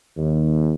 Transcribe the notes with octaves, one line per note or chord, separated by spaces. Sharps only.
D#2